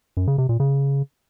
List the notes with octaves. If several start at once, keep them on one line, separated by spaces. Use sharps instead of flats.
F#2
C#3
C3
A#2
C#3